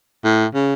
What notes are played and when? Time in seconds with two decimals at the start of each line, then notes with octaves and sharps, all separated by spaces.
0.24 A2
0.54 C#3